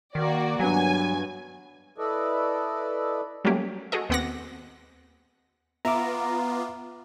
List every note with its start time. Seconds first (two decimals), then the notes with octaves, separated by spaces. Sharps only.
0.15 D#3 A#3 F#4 D5
0.60 G2 F#3 B3 F#4 G#5
1.98 E4 A4 B4 D5 D#5
3.44 F#3 G3 A3 A#3 C#4 G4
3.92 F#4 G#4 A4 D#5
4.09 D#2 B3 C4 F#5 D6 A#6
5.85 B3 F4 E5 A#5 D6